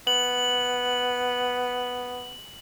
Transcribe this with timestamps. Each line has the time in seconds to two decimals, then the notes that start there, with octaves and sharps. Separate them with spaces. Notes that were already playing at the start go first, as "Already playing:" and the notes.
0.07 B3 F#7